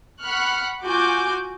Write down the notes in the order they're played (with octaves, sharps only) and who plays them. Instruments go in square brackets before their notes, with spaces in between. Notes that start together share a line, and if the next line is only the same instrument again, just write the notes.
[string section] F#5 B5 C#6 F6 F#6
F4 F#4 G#5 D6 G6